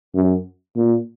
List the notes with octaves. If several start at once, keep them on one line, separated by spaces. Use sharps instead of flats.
F#2
A#2